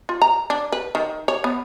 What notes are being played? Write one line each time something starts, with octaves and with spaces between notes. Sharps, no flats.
F4
A#5
D4
B4
D#3
C#5
B3